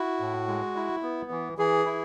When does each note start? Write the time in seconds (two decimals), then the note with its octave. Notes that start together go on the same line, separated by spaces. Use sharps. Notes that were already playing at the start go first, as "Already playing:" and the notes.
Already playing: E4 F#4
0.20 A2
0.48 G#3
0.76 E4
1.03 B3
1.31 E3
1.58 E3 G#4
1.86 E4